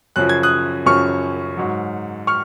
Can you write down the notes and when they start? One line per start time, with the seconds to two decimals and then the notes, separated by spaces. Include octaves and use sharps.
0.16 F#2 C#3 F3 F#6
0.29 G#6
0.43 D#6 F#6
0.86 F#2 C#3 F3 C#6 F6
1.57 G#2 F#3
2.27 C#6 F6